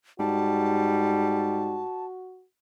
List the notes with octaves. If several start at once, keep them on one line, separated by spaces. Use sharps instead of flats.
G#2 G3 F#4 A5